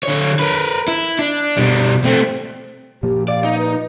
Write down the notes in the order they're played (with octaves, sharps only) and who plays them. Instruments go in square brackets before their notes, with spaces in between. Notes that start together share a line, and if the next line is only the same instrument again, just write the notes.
[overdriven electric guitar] D3 C#5
A#4 B4
E4
D4
B2 G3
A3 C4
[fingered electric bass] A#2 F3 [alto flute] G4
[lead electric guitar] D5 [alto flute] F5
[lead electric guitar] D#4
[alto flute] B4